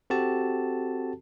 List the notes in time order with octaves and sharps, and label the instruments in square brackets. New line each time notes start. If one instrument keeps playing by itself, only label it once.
[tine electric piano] C4 F#4 G4 A4 A5